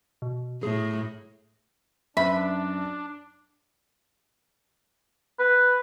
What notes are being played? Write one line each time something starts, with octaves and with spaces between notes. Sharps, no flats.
B2
A2 G#4
F#2 D4 B4 C5 E5 B5
B4